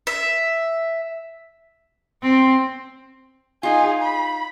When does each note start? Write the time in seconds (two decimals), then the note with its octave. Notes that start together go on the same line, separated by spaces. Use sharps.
0.07 E5
2.23 C4
3.63 D#4 F4 G#4
4.02 B5